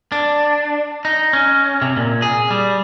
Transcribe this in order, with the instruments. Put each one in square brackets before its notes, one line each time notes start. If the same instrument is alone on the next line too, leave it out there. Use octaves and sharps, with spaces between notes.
[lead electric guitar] D4
D#4
C#4
C3
A#2
G#4
G3